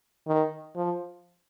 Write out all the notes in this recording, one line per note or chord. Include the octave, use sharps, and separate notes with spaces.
D#3
F3